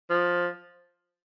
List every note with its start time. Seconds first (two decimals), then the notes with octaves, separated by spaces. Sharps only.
0.10 F3